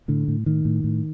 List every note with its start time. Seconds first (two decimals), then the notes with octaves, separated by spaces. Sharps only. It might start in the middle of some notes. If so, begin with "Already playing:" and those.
0.08 A2 D3
0.28 A2
0.46 A2 D#3
0.65 A2
0.84 A2